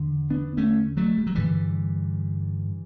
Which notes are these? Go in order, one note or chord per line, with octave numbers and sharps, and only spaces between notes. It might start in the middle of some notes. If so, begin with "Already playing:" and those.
Already playing: E2 D3
B3 D4
A3 C#4
F#3 A3
G3
F#3
G2 D3 E3 G3